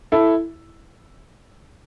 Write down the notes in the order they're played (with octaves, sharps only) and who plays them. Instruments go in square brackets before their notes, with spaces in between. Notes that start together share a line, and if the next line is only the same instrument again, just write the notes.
[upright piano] E4 A4